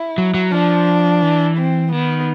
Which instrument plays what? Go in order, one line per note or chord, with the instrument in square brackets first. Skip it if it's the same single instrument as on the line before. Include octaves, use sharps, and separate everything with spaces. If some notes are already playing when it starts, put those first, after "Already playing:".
Already playing: [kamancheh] E4
[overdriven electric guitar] F#3
F#3
[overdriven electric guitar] F3 [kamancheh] D4
[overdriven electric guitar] E3
[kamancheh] C4
[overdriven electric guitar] D#3 [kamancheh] B3